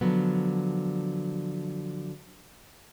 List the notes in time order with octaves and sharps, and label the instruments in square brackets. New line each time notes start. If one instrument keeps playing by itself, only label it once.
[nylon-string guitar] D3 F3 F#3 B3